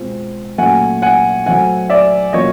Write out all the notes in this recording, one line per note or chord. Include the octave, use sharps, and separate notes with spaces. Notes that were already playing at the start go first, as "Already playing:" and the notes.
Already playing: B2 G#3 C4 F4
A#2 F#3 A3 C#4 F#5 G#5
F#5 G#5
F#3 A3 C4 F#5 G#5
D5 E5
B2 F#3 A#3 C#4 F4 C#5 D#5